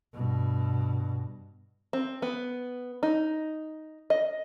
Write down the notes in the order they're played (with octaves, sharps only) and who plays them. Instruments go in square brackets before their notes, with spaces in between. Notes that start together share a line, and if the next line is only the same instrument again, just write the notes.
[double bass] G2 B2
[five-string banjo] C4
B3
D#4
D#5